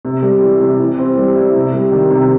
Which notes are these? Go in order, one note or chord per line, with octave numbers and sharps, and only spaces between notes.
C3
G3
E3
C3
E3
C4
G3
E4
C3
G3
D#3
C3